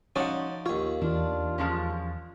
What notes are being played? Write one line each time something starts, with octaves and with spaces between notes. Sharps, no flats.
F3 C#4 D#4 F#4 D5 F#5
D#2 F4 C#5
E2 D4 F4
F3 G#3 C#4